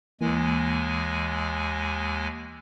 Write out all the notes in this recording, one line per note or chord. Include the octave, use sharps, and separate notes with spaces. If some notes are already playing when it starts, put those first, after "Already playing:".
D#2 E3 G#3 A#3 G#5